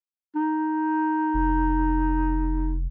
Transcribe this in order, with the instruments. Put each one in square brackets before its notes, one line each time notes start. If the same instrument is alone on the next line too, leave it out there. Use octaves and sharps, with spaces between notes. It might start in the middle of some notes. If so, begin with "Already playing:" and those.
[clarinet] D#4
[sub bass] F1